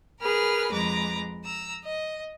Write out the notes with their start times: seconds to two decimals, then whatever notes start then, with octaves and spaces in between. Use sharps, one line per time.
0.21 G#4 A#4 B4 F6
0.72 F2 G#3 B4 A#5 D6
1.44 A#5 E6
1.84 D#5